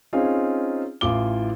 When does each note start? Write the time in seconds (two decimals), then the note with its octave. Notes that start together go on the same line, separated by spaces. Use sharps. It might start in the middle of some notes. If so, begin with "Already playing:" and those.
0.13 C4 C#4 D#4 F4 G#4
1.01 A1 E4 F4 D6 G7